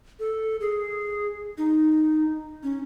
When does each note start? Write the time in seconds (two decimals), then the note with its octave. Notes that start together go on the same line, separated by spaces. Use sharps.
0.20 A4
0.60 G#4
1.58 D#4
2.63 C#4